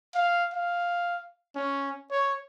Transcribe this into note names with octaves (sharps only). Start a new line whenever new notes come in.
F5
F5
C#4
C#5